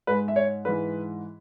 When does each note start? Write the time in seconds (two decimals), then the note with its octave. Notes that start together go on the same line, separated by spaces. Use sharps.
0.07 G#2 G#3 B4
0.28 E5
0.36 C#5
0.65 G#2 E3 G#3 B4